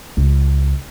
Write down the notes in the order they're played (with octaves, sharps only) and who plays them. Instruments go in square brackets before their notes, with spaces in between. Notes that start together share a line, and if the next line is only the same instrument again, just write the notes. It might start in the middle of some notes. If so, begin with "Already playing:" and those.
[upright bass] C#2